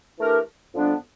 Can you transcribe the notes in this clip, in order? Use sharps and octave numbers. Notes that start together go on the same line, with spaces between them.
E3 A3 D4 G4 A#4
F2 D3 G3 B3 D4